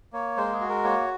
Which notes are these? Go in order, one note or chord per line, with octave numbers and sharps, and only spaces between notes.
A#3 C#5
G#3 C5
G#4
F#4
A#4
A#3 C#5